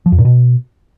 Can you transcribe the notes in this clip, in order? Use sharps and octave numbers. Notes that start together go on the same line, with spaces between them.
F3
F2
A#2
B2